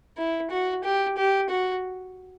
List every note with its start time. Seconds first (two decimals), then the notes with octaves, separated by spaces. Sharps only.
0.17 E4
0.50 F#4
0.84 G4
1.17 G4
1.50 F#4